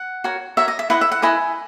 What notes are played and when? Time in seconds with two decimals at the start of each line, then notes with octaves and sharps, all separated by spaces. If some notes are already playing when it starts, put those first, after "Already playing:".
Already playing: F#5
0.24 F#4 A#4 C#5
0.57 F#4 A#4 C#5 E5
0.68 D#5
0.79 E5
0.90 E4 B4 D#5 F#5
1.01 E5
1.12 F#5
1.22 E4 B4 D#5 G#5